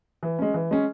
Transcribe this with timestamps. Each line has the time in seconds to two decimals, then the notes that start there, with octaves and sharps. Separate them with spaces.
0.23 E3
0.39 G#3 C#4
0.54 E3
0.71 G#3 C#4